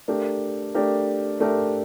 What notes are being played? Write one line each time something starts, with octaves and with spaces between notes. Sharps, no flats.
A3 D4 G4 A#4
A3 D4 G4 A#4
A3 D4 G4 A#4